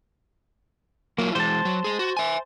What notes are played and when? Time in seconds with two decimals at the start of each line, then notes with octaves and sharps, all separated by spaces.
1.18 F#3 A#3 E4 F4
1.35 E3 G#3 C5 A5
1.65 F#3
1.84 G#3 G#4
1.99 F#4
2.17 E5 G#5